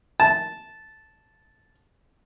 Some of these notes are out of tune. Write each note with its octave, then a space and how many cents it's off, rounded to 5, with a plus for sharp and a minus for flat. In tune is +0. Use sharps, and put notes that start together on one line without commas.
A5 -10